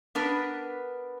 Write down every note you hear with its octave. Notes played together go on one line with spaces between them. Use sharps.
B3 D4 A#4 B4